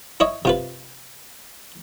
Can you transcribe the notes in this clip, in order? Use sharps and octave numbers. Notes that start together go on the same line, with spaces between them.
E4 C#5 D#5
C3 F4 B4